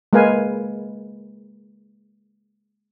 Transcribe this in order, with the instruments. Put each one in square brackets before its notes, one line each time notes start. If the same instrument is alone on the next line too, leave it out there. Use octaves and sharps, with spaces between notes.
[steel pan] G#3 A#3 A#4 B4 F5 G#5